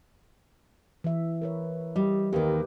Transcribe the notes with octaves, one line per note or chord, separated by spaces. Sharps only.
E3 E5
A#4 B4 C#5
G3 D#5
D#2 D#3 G4 A#4 B4